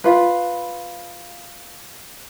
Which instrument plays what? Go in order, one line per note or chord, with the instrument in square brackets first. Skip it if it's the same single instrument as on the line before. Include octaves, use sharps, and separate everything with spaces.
[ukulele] F4 B4